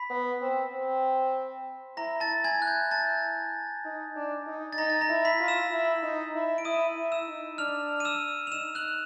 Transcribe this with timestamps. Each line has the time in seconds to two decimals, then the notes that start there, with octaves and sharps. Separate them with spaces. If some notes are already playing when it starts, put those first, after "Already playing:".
Already playing: B5 B6
0.10 B3
0.42 C4
0.73 C4
1.97 E4 A#5 A#6
2.20 A5 A6
2.29 E4
2.44 G#5 G#6
2.59 E4 F#6
2.68 G6
2.91 A5 A6
3.85 D#4
4.16 D4
4.47 D#4
4.73 A6
4.78 D#4 A#5 A#6
4.90 A6
5.01 A#5 A#6
5.09 E4
5.25 B5 B6
5.40 F4
5.48 E6 E7
5.71 E4
6.03 D#4
6.34 E4
6.58 D7
6.65 E4 D#6 D#7
6.96 E4
7.12 E6 E7
7.27 D#4
7.58 D4 F6 F7
8.00 D#7
8.05 E6 E7
8.47 F7
8.52 D#4 E6 E7
8.75 F#6 F#7